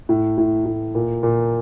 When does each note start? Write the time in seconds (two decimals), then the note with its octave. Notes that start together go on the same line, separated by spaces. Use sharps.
0.09 A2
0.38 A2
0.66 A2
0.95 A#2
1.23 A#2